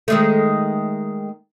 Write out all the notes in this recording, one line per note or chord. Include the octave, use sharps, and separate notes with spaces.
D#3 G#3 A3